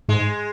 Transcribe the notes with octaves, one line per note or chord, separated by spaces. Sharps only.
G#2 G#3